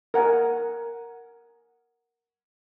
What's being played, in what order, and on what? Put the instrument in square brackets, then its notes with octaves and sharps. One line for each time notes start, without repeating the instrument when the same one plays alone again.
[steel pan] A#4 F#5 G#5